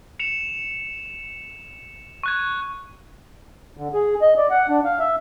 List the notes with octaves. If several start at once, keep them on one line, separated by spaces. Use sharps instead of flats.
C#7 E7 F7
C#6 F#6 G#6
D3
G#4
D#5
D5
F#5
D4
F5
E5